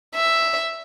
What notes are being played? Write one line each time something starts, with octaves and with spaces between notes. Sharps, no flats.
E5